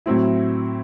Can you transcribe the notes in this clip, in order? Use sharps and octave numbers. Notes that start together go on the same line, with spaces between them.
A2 F#3 C4 E4